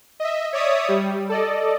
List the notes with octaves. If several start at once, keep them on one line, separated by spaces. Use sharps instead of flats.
D#5 E5
C#5 D5 E5 D#6
G3
A4 D5 D#5